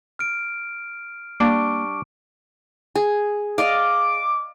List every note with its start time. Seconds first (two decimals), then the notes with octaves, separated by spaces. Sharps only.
0.19 F6 D7
1.40 G3 A#3 D4 C#6 D6 D7
2.95 G#4
3.58 D5 D#5 F5 D6